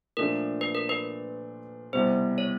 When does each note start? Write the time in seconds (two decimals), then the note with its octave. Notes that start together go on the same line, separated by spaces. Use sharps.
0.17 A#2 F3 A3 D4 A#4
0.61 B4
0.75 A#4
0.89 B4
1.93 C2 B2 G3 C5
2.38 C#5